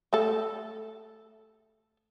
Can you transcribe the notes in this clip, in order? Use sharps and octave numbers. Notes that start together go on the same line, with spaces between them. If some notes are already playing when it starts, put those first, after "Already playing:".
A3 A4